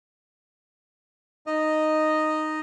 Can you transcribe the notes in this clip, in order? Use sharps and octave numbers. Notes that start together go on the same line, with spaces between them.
D#4 D#5